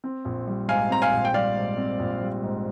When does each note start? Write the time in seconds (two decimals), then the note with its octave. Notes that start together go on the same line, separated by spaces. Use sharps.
0.04 C4
0.25 A#1
0.47 G3
0.68 G#2 F5 G#5
0.90 C4 A#5
1.02 F5 G#5
1.13 A#1
1.25 G5
1.34 G3 D5 F5
1.55 G#2
1.78 C4
1.99 A#1
2.21 G3
2.43 G#2